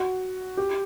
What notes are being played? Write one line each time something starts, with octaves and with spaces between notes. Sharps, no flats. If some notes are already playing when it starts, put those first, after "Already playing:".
Already playing: F#4
G4